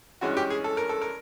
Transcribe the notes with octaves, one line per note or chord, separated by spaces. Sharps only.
G2 E3 G#3 C#4 F#4
G4
G#4
A4
A#4
A4
A#4